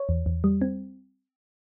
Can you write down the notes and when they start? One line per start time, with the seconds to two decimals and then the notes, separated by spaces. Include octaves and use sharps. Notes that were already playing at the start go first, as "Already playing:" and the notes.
Already playing: C#5
0.09 E2
0.26 E2
0.44 G3
0.62 C4